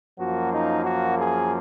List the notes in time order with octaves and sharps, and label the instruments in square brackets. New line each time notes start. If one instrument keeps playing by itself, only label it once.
[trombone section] F#2 F3 A#3 F#4
D#4
F#4
G#4